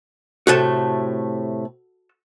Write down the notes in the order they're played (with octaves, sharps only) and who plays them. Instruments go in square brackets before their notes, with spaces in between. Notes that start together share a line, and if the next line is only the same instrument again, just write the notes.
[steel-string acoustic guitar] A2 C3 A3 [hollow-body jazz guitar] F#4 A4 A5